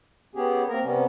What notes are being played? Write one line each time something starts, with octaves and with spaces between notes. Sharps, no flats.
B3 C#4 G4 G#4
A#3 C4 A#4 A#5
C3 G3 B3 C#4